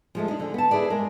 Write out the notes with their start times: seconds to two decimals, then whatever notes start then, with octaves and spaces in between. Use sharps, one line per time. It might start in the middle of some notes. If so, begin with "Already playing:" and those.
0.15 F3 G#3 A3
0.28 D4 D#4
0.40 D3 G#4
0.54 B3 A5
0.71 E4 G#4 B4 D5
0.90 G#3 A#4